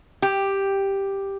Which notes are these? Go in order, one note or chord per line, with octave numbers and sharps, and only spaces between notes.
G4